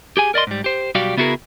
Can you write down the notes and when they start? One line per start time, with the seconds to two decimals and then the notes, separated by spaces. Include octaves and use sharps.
0.17 G4 G#4 G#5
0.34 A#4 D5 D#5 C6
0.47 G#2 G3
0.64 G4 C5
0.95 B1 G3 F#4 G4 D5 F5
1.17 C#3 B3 E4 F#4 G#4 A#4